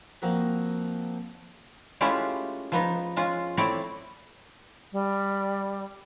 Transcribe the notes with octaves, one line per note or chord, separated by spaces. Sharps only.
F3 A#3 C4 D#4 F#4
G#3 A3 C#4 E4 F4 G4
F3 B3 D#4
G#3 C#4 F4
A3 C4 E4 C#5 D5
G3